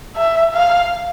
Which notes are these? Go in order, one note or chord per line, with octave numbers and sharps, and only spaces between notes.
E5
F5